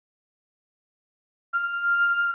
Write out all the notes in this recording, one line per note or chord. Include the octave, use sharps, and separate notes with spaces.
F6